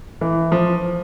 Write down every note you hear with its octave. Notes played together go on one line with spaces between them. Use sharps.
E3
F3